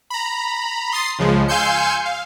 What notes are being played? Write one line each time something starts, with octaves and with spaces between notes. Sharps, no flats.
A#5 B5
C6 D#6 A6 C7
C#2 C#3 F3 G#3
F5 G#5 C6 E6 G6 C#7
F5